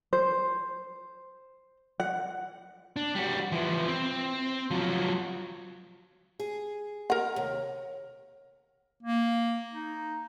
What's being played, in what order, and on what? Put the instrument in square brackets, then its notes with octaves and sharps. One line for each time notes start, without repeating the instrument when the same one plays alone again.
[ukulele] C5
F#5
[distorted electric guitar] D4
G3 F#4
E3 F3
C4
F3 F#3
[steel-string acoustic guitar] G#4
[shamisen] A#4 F#5
[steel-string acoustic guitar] D#2 C3
[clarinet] A#3
D#4